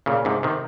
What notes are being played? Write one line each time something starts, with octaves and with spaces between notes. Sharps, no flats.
A#2 C#3
G#2 C3
C3 D#3